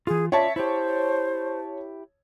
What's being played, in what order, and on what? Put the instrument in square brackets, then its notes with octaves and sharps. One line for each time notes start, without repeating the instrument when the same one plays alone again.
[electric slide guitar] E3 F4 [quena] G#4
[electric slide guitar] F4 D5 [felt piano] C#5 A5 [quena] E5
[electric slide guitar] E4 G4 [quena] C5